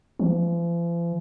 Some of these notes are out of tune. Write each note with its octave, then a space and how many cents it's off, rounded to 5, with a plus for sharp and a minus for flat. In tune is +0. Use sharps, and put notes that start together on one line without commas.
F3 -45